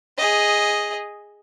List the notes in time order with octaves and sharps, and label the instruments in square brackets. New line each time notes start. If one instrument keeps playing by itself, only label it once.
[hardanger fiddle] G#4 D#5